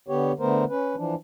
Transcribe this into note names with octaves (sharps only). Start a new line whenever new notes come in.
D3 B3 G4 C#5
D3 A3 B3 A#4 C5
C#4 B4
E3 F3 D4